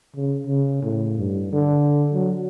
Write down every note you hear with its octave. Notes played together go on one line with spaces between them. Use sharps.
C#3
C#3
A2
G2
D3
F#3